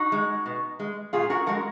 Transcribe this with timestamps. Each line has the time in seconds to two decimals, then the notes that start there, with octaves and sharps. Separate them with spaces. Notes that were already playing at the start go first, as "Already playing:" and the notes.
Already playing: D#4 F#4
0.12 G#3
0.46 B2
0.80 G#3
1.13 A#2 F4 G#4
1.30 F#4 A#4
1.46 F3 G#3 F#4 A#4